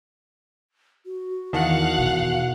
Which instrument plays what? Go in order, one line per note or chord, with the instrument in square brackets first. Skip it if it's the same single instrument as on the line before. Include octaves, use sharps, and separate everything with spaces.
[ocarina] F#4
[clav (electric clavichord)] E2 D#3 A5 [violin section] F5 F#5
[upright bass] B2